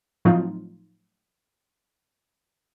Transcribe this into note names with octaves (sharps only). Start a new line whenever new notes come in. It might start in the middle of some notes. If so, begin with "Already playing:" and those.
A2 F3 F#3 C4 D#4 F4